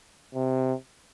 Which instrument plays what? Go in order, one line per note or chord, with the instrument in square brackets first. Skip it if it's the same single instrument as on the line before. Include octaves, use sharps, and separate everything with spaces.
[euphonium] C3